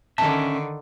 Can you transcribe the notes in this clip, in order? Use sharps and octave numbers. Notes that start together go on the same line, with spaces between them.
D3 D#3 C#4 E5 A5